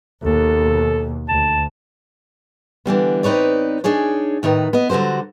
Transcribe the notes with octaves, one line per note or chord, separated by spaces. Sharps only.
D#2 B2 A4
D2 A5
D3 E3 G3 B3
C4 D#4 B4 C#5 D5
D4 D#4 G#4 C#5
A2 D#3 D#4 B4
B3 D#5
D3 F#3 G3 F#4 C5